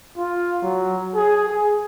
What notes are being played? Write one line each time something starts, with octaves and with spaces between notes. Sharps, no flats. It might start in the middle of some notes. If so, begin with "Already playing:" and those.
F4
F#3
G#4
G#4